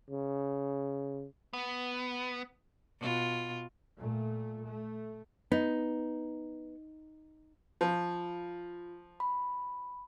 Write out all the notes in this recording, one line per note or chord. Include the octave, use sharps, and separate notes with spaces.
C#3
B3
B2 F4
A#2 A3
A3
B3 D#4
F3 F4
B5